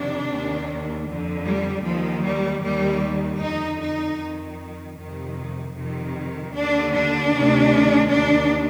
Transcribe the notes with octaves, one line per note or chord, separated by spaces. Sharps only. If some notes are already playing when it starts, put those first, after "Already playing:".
Already playing: F2 C3 D#3 D4
D#2 D#3
F2 D3
G3
D#2 D#3 F3
G3
D#2 D#3 G3
F2 D3 D#4
D#4
F2 D#3
F2 C3 D#3
F2 C3 D#3
D#2 D3 D4
D4
D2 C3 D#3
D#2 D#3 D4